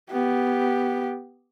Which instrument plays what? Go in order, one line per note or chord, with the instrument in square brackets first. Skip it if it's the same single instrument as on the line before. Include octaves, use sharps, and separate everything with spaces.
[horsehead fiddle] B3 G4